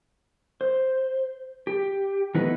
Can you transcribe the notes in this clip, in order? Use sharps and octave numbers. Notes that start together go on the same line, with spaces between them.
C5
G4
E3 A3 B3 D#4 B4